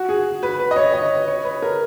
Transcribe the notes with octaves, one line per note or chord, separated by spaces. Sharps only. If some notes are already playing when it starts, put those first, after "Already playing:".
Already playing: F#4
G#4
B4
B4
D#5
C#5
D#5
C#5
B4
A#4